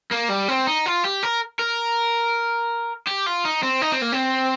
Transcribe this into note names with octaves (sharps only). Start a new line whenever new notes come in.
A#3
G3
C4
D#4
F4
G4
A#4
A#4
G4
F4
D#4
C4
D#4
C4
A#3
C4